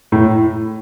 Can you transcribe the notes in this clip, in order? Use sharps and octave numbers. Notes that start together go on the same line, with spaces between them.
A2